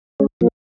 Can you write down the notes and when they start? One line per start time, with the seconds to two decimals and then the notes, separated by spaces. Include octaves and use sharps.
0.20 G#3 C#4
0.41 F3 A#3